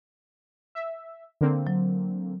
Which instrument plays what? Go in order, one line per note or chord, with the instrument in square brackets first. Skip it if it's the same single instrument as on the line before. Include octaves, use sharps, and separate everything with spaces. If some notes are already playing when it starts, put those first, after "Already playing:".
[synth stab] E5
D3 A#3 C4
[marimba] F#3